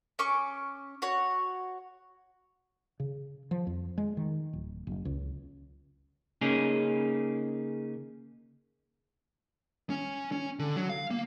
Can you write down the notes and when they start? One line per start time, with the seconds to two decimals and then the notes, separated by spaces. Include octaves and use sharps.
0.19 C#4 C#6 D6
1.02 F#4 C#5
3.00 C#3
3.51 F3
3.67 F2
3.98 G#3
4.17 D#3
4.53 D1
4.87 F#1
5.05 C#2
6.41 C#3 A#3 C#4 D#4 G#4
9.90 C#4
10.32 C#4
10.59 D3
10.76 F#3
10.89 F5
11.11 A#3